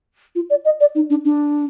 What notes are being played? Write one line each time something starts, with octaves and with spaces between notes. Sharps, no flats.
F4
D5
D#5
D5
D#4
D4
D4